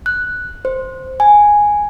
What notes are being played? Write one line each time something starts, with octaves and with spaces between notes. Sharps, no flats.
F#6
C5
G#5